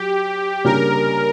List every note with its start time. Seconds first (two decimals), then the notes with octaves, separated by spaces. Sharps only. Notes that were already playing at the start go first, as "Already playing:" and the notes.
Already playing: F#3 G4
0.65 C#3 G3 A#3 D4 A#4